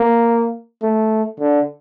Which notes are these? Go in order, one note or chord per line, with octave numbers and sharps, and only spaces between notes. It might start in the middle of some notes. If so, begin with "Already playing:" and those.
Already playing: A#3
A3
D3